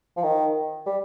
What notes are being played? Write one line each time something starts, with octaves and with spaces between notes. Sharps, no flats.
F3
D#3
G3